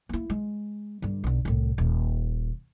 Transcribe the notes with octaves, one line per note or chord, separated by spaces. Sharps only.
A#3 E4
G#3
G2 D3
B1 D3
C2 A2
D#1